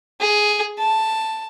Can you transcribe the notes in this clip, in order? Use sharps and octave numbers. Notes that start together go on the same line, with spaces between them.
G#4
A5